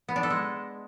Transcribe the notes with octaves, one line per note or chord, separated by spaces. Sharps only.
B3
D4
A4
G#3